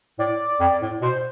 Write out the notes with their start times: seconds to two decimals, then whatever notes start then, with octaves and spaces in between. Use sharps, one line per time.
0.19 A2 D5
0.60 F2
0.82 A2
1.01 B2 C5